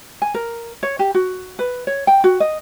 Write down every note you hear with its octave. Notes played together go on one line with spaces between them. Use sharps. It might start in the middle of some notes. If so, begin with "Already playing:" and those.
G#5
A#4
C#5
G4
F#4
B4
C#5
G5
F#4
D#5